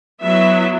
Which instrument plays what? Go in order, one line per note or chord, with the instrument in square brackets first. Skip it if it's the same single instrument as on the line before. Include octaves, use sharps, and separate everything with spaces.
[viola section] F#3 B3 E4 E5